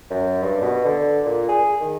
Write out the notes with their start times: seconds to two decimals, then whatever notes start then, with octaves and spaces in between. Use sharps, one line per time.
0.10 F#2
0.42 G2
0.61 B2
0.85 D3
1.25 A#2
1.49 G#4
1.81 D#3